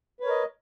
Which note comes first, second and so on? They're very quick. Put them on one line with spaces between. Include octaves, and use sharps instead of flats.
B4 C#5 A#4 D#5